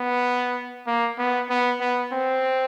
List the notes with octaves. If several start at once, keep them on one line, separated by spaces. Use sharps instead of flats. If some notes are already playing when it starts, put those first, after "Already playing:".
Already playing: B3
A#3
B3
B3
B3
C4